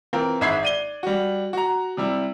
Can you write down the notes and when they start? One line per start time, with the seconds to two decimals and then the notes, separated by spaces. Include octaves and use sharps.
0.13 E3 C4 F4 A#4
0.41 G#1 G#2 E5 B5 G#6 C7
0.63 D5 D#7 G7
1.03 G3 F#4
1.53 F#4 A#5
1.97 C3 G3 E4